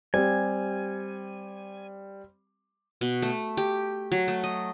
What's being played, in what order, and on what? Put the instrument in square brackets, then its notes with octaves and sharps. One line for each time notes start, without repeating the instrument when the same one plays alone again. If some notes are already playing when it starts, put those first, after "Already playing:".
[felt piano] G3 [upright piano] C4 G4 [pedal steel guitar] G#5
[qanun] B2
A3
G4
F#3
A3
D#5